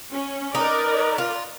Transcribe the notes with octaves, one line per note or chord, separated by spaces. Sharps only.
C#4
D#4 A#4 B4 D5
F4